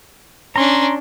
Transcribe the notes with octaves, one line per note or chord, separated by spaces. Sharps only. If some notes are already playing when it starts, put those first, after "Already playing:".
C#4 D4 A#5 C6